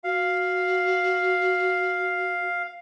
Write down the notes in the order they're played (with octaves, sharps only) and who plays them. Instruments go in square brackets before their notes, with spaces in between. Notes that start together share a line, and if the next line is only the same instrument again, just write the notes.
[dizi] F#4 [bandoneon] F5